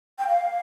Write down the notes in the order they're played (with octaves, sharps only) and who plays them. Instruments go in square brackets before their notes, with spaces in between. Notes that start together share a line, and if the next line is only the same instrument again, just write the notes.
[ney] G5
F5